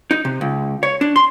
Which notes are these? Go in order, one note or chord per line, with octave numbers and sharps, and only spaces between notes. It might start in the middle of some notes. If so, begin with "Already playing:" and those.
D#4
C3
C#2
C#5
D4
C6